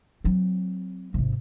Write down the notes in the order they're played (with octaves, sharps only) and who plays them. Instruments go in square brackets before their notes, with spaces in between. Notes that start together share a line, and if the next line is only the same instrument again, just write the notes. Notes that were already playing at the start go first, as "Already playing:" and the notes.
[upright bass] F#3 C4
G#1 C3